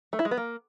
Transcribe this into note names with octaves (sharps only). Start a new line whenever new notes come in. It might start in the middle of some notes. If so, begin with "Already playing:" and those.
A3
E4
G#3
B3
A#3